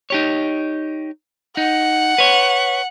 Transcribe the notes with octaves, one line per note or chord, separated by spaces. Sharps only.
D#4 G4 C#5
D#4 F#5
B4 C#5